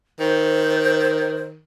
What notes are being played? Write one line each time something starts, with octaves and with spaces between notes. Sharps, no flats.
D#3 C5